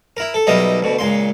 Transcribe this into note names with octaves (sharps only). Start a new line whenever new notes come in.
E4 A#4
A4
B1 B2 G3 A#4 D#5 E5
D2 B2
C#2 A#2 C6